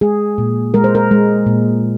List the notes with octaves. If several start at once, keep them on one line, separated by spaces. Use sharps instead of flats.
G#3 G#4
A#2
G#3 A#4
C5
A#4
G#3
A#2